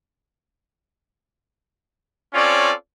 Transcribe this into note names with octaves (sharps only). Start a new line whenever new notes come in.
C4 C#4 F4 A4 C#5 D5